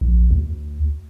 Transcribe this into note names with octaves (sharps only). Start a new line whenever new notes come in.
A#1
D2